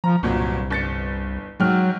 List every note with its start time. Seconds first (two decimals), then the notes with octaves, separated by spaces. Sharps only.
0.04 F3 A#5
0.23 G1 C2 A#2 F#3
0.70 G1 A6 C#7
1.60 G#2 F#3 G5 F6